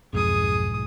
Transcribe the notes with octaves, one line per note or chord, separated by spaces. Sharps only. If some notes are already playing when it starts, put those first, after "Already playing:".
B1 F2 G#2 F3 G#4 D#6